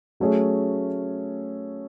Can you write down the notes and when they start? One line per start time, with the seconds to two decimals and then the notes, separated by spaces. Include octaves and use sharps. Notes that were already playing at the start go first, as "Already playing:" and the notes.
0.20 F#3 A3 C#4 G#4